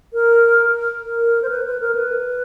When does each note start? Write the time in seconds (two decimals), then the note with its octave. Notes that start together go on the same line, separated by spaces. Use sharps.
0.13 A#4
1.04 A#4
1.42 C5
1.49 B4
1.65 B4
1.80 A#4
1.95 B4